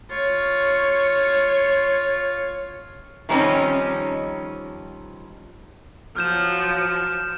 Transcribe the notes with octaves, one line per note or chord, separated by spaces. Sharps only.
F4 C#5
D#3 F3 G3 C4 C#4 D#4
F3 F#3 F6 G6 E7